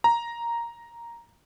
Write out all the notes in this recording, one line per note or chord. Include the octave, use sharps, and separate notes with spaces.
A#5